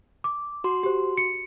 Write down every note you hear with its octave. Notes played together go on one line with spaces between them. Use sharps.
D6
F#4 C6
G4 C5
C#7